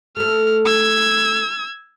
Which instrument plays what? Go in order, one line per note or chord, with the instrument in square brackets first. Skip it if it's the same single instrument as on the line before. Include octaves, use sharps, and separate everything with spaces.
[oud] A3 A4 [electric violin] F6
[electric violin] E6 G#6